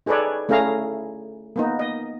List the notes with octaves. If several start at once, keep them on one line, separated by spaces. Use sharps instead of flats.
D#4 G#4 A4 B4 C#5 D5
A3 C#4 E4 G#4 F5 A#5
A#3 B3 D#4
D#5